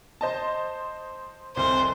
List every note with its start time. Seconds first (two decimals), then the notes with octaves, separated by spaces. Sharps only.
0.21 C5 D#5 A5
1.57 F1 C2 C5